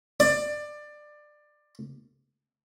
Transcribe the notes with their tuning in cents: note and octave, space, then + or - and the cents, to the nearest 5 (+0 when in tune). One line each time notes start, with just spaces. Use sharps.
D5 +20